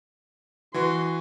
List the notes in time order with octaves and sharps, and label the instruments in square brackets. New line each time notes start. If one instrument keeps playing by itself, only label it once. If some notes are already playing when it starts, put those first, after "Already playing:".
[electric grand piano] E3 F#4 B4 [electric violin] C6